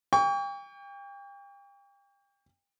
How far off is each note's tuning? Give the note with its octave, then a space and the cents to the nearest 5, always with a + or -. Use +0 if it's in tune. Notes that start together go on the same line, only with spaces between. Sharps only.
G5 +35 C#6 +40